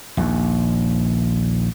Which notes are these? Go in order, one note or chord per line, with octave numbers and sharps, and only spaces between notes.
A#1 D#2